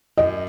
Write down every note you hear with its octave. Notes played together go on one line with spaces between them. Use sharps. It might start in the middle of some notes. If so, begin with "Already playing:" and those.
F#2 D#5